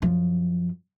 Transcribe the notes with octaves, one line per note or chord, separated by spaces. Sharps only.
F#2 F3